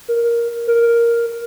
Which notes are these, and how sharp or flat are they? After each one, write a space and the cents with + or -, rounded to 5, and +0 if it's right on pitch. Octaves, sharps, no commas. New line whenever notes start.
A#4 +5
A#4 +5